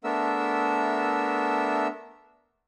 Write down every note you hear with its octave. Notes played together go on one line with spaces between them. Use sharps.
A3 B3 D4 A#4 E5 E6